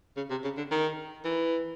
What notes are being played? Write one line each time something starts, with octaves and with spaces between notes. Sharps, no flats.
C#3
C3
C#3
D3
D#3
E3